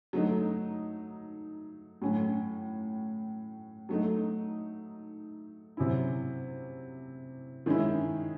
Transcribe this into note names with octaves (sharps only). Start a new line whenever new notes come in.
F#3 A3 D#4
A2 F#3 C#4
F#3 A3 D#4
C3 F#3 C#4 E4
D#3 G#3 C#4 E4